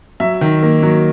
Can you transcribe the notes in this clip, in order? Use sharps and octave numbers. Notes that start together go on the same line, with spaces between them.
F#3 E5
D#3
A#3
F#3